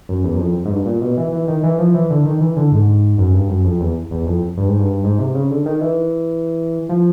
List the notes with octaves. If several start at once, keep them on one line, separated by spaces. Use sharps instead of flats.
F#2
E2
F#2
F2
G#2
G2
A#2
B2
E3
E3
D#3
E3
F3
E3
D3
D#3
E3
D3
G#2
F#2
G2
F#2
F2
E2
E2
F2
G2
G#2
G2
G#2
C3
C#3
D3
D#3
E3
F3